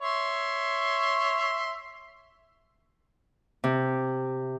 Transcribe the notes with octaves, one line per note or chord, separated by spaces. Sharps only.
C#5 E5 C6
C3